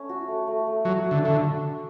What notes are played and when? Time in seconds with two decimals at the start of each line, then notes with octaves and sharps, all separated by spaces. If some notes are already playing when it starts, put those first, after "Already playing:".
Already playing: A3 C#4
0.09 F#4
0.28 A3
0.47 A3
0.67 A3
0.85 F#3 F#4
1.05 F#4
1.11 D3
1.24 D3 A3